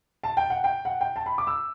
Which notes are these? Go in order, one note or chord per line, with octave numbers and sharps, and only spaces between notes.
A5
G5
F#5
G5
F#5
G5
A5
B5
D6
E6